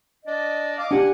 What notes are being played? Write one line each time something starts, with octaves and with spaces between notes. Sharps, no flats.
D4 D5 D#5
D#5 F5 D6
D4 G4 F#5 G#5